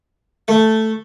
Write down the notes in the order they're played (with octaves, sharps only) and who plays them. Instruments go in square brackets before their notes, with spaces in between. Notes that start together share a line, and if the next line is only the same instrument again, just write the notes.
[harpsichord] A3